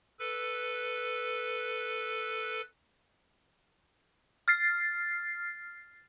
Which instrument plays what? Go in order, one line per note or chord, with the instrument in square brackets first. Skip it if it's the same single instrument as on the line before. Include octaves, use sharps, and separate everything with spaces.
[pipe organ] A4 B4
[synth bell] F6 A6 C7